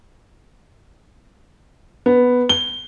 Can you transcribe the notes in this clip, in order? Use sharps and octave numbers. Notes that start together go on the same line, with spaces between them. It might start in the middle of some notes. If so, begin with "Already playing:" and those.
B3
G7